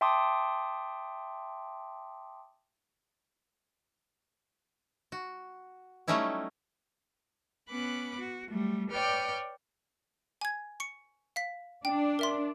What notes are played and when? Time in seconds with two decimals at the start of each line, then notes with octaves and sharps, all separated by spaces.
0.01 E5 G5 A5 C6 D6 D#6
5.12 F#4
6.08 F#3 G3 A3 C#4 D#4 E4
7.69 B3 C#4 B5 D6 F#6
8.19 F#4
8.51 F#3 G3 A3
8.90 B4 C#5 D5 G5 F6 G6
10.41 G#5 G#6
10.80 C#6 C#7
11.36 F5 B6
11.85 D4 G5
12.19 A#4 E5 C6